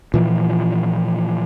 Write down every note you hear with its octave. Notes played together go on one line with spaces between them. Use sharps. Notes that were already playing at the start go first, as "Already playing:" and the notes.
A#2 E3 F3